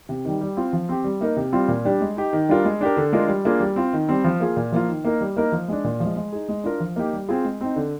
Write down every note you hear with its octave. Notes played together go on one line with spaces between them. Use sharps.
C3
D#3 G3
G3
C4 F4
F3
C4 G4
G3
A#3 D#4 A#4
C3
G3 C4 F4
A#2
G3 D4 G4
G#3
D#4 G4
D#3
G3 D4 F4 A#4
G#3
D4 G4 A#4
D3
G#3 D4 F4 A#4
G3
A#3 D4 F4 G#4
G3
C4 F4
D#3
G3 C4
F3
A#3 F4 G#4
A#2
F3 A#3 F4
D#3
A#3 D#4 A#4
G3
A#3 D#4 A#4
F3
G#3 D4
A#2
F3
G#3
G#3
D#4 G#4
G#3
D4 F4 A#4
F3
A#3 D#4 G4
G3
C4 F4 G#4
G#3
C4 D#4
D3